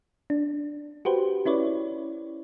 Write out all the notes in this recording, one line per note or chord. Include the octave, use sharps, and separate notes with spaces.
D4
F#4 G4 B4 C5
C#4 E4 B4 C#5 D5